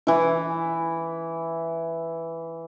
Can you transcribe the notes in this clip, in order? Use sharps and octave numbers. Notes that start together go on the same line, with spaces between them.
E3 E4